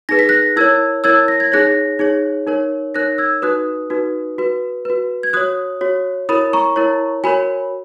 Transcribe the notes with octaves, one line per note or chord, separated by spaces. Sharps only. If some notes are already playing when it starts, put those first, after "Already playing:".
D#4 G#4 B4 A#6
B6
F#6 A#6
E4 A#4 C#5 E6 G#6
E4 A#4 C#5 E6 G#6
A#6
G#6
D#4 G#4 C#5 F#6 A#6
D#4 G#4 C#5
D#4 A#4 C#5
D#4 A#4 C#5 F#6 A#6
E6 G#6
D#4 F#4 B4 D#6 F#6
D#4 F#4 B4
F#4 B4
F#4 B4
G#6
F#4 C#5 D#6 F#6
F#4 C#5
E4 A#4 C#5 B5 D#6
A#5 C#6
E4 A#4 C#5
F#4 A#4 C#5 G#5 B5